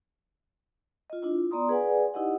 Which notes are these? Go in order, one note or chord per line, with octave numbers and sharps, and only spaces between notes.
F4 D#5
D4 E4 F4
B3 D5 A#5 C6 D#6
G#4 B4 D5 F#5 G#5
D#4 E4 G4 D#5 F#5